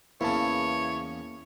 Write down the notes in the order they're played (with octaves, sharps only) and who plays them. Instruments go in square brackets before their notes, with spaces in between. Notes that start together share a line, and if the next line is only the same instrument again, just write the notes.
[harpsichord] E2 C#3 [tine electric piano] A#3 [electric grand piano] E4 A5 [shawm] C#5